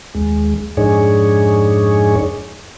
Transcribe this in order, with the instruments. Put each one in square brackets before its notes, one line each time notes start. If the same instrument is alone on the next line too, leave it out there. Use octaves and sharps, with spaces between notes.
[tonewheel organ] D#2 G#3
F2 G#2 D4 D#4 G#4 C#5